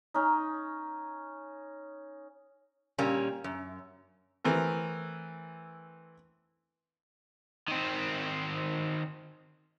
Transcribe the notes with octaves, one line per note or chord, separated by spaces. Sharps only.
C#4 D#4
A#2 G3 A#3 C#4
F#2
E3 A3 C4 A#4
D#3 C4